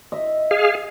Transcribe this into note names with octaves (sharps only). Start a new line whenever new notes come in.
D#5 E5
G#4 F5